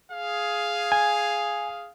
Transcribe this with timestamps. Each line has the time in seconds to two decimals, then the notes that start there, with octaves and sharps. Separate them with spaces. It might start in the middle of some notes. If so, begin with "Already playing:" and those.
0.11 G#4 F5
0.92 G#5